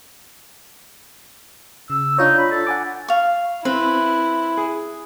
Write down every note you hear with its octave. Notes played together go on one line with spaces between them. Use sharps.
C#3 E6
D4 D#4 F4 C#5
B5
A4
F#5 G#5 D6
F5 C#6
C4 E4 B4
G#4